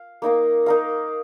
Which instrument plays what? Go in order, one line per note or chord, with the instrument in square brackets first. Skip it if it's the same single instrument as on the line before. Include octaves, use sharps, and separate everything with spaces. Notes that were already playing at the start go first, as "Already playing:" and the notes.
Already playing: [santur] F5
A#3 D#4 A#4 F5
D#4 A#4 F5